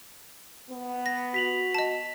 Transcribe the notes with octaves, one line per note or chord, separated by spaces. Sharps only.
B3
A#6
F#4 B6 F7 F#7
D#5 A5